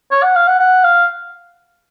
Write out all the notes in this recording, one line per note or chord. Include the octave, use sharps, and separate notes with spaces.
C#5
F#5
F5
F#5
F#5
F5